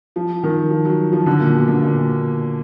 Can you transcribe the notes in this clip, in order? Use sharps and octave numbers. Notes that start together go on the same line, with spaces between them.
F3
D#3
F3
F#3
F3
D3
A#2
B2
D3
A#2